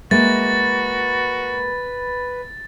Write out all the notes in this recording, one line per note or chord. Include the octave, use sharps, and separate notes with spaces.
G#3 A#3 F#4 B4 E5 A6